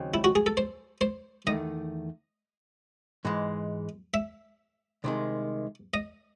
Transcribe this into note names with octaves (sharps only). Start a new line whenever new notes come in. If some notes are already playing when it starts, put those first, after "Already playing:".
Already playing: D#2 C#3 F#3 C4
E4
F#4
G#4
A4
C5
C5
E2 D#3 A3 D#5
G#2 E3 G#3
E5
C2 C3 D#3 G#3
D#5